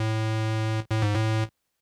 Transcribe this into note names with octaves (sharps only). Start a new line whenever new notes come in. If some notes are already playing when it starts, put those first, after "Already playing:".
Already playing: A2
A2
G#2
A2